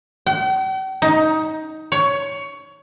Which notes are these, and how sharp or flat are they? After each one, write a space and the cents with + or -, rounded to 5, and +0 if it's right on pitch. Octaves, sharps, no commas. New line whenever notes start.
G5 -45
D#4 +15
C#5 +15